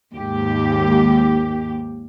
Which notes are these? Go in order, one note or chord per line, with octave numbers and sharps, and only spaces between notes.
D#2 G#2 G4